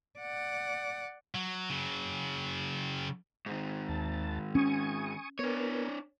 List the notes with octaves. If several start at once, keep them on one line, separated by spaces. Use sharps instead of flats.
D5 F#5
F#3
C#3 F#3
G#2 D#3
D#2 A5
C#4 G#5 C#6 D#6
B3 D4 A#4 C#5